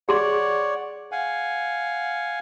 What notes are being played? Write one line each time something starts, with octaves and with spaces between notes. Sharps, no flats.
G#4 C#5 D5 F#5 C6
F5 F#5 G#5